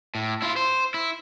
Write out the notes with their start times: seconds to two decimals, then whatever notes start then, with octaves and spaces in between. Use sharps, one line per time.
0.15 A2
0.42 E4 F4
0.56 C5
0.94 E4